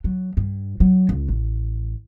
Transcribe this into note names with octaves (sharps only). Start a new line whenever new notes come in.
F#3
G2
F#3
C#2
A1